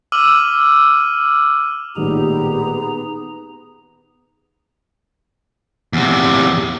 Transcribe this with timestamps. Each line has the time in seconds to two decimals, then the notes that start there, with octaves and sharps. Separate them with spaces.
0.12 D6 E6 F6 D#7 F#7
1.96 A1 A#2 D#3 B3 D#4 G4 G#4 A#5
5.93 E2 C3